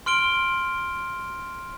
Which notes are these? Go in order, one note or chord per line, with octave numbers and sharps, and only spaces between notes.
C6 F6 D7 G7